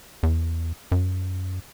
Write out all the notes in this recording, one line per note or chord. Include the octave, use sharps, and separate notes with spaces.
E2
F#2